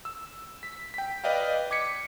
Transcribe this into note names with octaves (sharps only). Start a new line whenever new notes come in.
E6
B6
G5 B6
B4 D5 D#5 F5 G5
D6 G#6 B6 C#7